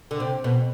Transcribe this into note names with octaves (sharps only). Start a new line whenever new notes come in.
D3
C3
B2